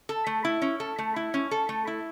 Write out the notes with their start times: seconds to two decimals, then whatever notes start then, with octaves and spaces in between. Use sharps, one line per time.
0.09 A4
0.27 A3
0.45 E4
0.62 C#4
0.80 A4
0.98 A3
1.16 E4
1.34 C#4
1.51 A4
1.69 A3
1.87 E4